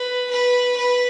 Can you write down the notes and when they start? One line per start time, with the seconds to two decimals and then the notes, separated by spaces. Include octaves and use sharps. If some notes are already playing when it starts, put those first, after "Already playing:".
Already playing: B4
0.31 B4
0.77 B4